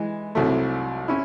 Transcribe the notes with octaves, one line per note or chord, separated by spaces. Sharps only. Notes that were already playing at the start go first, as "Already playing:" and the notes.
Already playing: E3 G#3
C2 C3 F#3 A3
C#4 E4